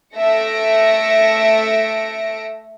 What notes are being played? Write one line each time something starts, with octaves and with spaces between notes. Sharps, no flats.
A3 E5 A#6 C#7 D7